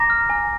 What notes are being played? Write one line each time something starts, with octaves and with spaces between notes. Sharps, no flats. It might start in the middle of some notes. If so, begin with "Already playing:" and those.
Already playing: A#5 D6 A#6
F6
G#5